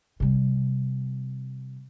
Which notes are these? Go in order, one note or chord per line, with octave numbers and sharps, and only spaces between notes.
C3 G3